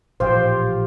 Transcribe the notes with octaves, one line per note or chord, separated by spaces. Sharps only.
A1 A#2 F3 F4 G4 C5 G5